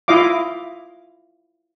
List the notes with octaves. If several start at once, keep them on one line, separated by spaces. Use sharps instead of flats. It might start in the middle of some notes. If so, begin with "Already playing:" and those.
E4 F4 D#5 F5 D6